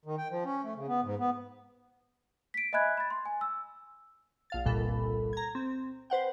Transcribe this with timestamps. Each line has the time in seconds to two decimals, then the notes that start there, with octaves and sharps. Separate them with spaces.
0.06 D#3
0.18 G5
0.31 F3
0.45 C#4
0.63 A3
0.76 C#3
0.88 B3
1.03 G#2
1.19 B3
2.54 B6 D7
2.73 D#5 E5 G#5 B5 F#6 G#6
2.97 B5 A6
3.10 C6
3.26 G#5
3.41 E6
4.50 A#1 F5 A6
4.65 G1 C2 A#2 A4 B5
5.33 A#5 G#6
5.55 C4
6.10 B4 C5 F#5 G5